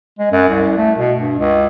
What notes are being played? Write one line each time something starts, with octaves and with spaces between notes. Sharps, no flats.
G#3
F#2
C2
A3
B2
G2
C#2